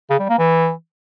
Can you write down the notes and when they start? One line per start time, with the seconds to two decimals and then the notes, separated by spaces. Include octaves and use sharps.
0.10 C#3
0.19 G3
0.29 A#3
0.38 E3